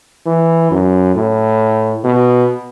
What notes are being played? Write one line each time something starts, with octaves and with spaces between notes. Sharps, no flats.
E3
F#2
A2
B2